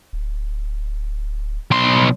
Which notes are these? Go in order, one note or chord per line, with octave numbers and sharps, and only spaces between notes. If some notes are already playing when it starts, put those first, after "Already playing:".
D1
B1 C6